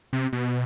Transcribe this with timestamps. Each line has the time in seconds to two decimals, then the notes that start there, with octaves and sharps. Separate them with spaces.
0.13 C3
0.33 B2